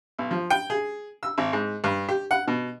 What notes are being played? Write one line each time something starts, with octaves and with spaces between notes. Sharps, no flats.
B1
F3
G5
G#4
E6
G#1
G#2
G2
G4
F#5
B2